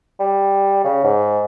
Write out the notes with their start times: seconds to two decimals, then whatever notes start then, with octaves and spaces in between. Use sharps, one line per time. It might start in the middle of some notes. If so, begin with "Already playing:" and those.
0.20 G3
0.84 C#3
1.04 G#2